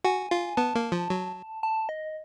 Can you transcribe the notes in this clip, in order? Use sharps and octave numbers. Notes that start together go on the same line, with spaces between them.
F#4 G#5
F4
B3 A5
A#3
F3
F#3
A5
D#5